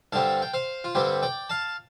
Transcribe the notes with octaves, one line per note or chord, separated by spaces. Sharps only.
G2 D3 G3 C4 F5 A5
G5
C5 F5
F4
G2 D3 G3 C4 G4
D5 G5
F5 A5